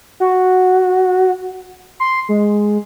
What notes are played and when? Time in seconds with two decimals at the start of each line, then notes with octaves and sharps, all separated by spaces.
0.20 F#4
2.00 C6
2.29 G#3